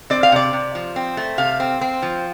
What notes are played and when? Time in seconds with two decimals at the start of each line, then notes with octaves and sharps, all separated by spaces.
0.10 C4 D5
0.23 F5
0.32 C3 D5
0.53 C3
0.75 F3
0.96 C4
1.17 A3
1.38 C3 F5
1.60 C4
1.81 C4
2.03 F3